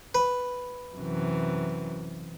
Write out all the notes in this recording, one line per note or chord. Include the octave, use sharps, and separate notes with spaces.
B4
F#2 C3 E3